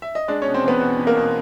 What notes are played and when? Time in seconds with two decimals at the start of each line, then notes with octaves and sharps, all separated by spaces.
0.02 E5
0.15 D#5
0.28 G#3 D4 D5
0.42 C#4 C#5
0.46 B2
0.54 C4 C5
0.64 E2 B3 B4
0.81 B2
0.98 E2
1.07 A#3 A#4
1.15 B2